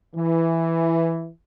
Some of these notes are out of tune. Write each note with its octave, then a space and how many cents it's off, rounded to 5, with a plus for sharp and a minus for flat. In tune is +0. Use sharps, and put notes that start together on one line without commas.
E3 +5